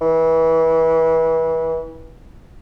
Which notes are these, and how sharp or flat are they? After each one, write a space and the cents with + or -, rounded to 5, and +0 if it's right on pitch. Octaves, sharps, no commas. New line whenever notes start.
E3 -25